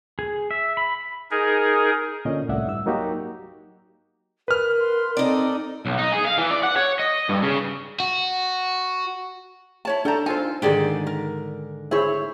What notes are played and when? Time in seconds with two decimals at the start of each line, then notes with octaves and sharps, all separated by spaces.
0.19 G#4
0.51 E5
0.77 B5
1.31 D#4 G#4 A#4
2.25 A#2 D3 C#4 D#5
2.49 C2 A2 D5 E5 F#5
2.68 G2 E6
2.86 F#3 A#3 D#4 F#4 G4
4.48 A#4 B4 F6
4.81 C6
5.17 C4 D#4 A4 D5 D#5
5.86 B1
5.99 D#4
6.13 G#4
6.26 F5
6.38 E3
6.51 D5
6.63 F#5
6.77 C#5
6.99 D#5
7.29 G2
7.42 C#3
8.00 F#4
9.85 E4 C#5 A5
10.05 D4 A4 G5 A5 A#5
10.26 D#4 F4 A4 C5 G#5
10.62 G#2 D3 D#3 G4 G#4 D5
11.07 A#4
11.91 E4 G#4 C5 C#5 E5